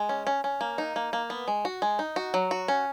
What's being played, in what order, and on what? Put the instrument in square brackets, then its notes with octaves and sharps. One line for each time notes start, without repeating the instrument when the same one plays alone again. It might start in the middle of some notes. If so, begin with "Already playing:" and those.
Already playing: [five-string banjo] G#3
C#4
C#4
C#4
A#3
D#4
A#3
A#3
B3
G#3
F#4
G#3
D#4
F#4
F#3
F#4
C#4